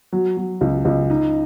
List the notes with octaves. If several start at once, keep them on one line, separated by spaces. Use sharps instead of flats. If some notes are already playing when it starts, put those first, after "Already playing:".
F#3
F#3
C#2
C#2
D#4